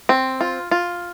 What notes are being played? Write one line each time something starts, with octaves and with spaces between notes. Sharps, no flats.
C4
F4
F4